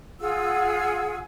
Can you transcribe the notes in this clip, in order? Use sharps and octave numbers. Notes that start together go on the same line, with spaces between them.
F4 G#4 F#5 E6